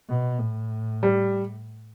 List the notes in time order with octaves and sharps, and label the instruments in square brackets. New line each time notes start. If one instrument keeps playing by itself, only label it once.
[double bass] B2
A2
[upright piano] G3